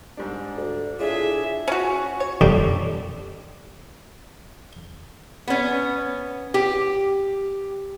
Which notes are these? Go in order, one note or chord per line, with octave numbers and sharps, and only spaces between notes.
G#2 G3 D4
D2
A2 D4 F4 G#4 E5
C#4 F#4
C#5
F2 D3 G3 A#3 D4 D#4
B3 C#4
G4